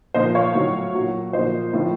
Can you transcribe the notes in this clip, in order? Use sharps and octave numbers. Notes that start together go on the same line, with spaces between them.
A#2 F3 C5 D#5
C#5 F5
A2 F#3
A#2 F#3
A#2 F3 C5 D#5
A2 F3